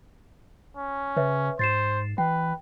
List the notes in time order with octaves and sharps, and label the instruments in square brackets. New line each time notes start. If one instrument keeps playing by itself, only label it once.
[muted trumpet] C#4
[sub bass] C#3 [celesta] B4 C#5 E5
[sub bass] G#2 [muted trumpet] C5 [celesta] A6 C7 E7
[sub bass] E3 [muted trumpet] B4 [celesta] G5